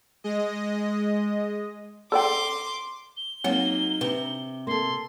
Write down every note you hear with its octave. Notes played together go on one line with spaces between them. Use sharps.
G#3 D#5
A4 D5 G5 C6 D6
G7
F#3 A#3 C4 D#4 C#5 F#5
C3 D4 B4
A#3 A4 C6